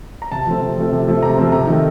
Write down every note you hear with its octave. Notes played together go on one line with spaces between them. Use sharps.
A#5
C3 A5
F3 A3 C4
C3
F3 A3 C4
C3
F3 A3 C4
C3 A#5
F3 A3 C4
C3 A#5
D#3 A3